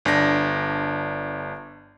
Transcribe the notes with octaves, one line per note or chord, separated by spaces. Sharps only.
G1 D4 A#6